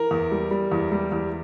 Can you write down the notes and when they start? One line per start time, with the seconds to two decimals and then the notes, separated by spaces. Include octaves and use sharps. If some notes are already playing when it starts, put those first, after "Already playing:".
Already playing: E3 A#4
0.11 E2
0.31 G3
0.51 G3
0.72 E2
0.92 G3
1.12 E2